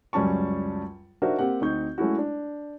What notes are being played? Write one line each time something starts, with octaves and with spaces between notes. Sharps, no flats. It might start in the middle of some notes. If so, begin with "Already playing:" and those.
C#2 F#2 G3 C#4 A5 C#6
D4 D#4 F#4 A#4 C5 E5
A#3 C4 G4 F#5
D2 C4 D#4 C#6 G6
G#3 A3 C#4 E4 F#4
D4